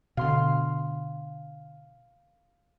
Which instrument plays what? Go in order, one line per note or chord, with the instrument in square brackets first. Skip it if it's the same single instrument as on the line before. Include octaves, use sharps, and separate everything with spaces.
[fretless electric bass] B2 D3 [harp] F5 C6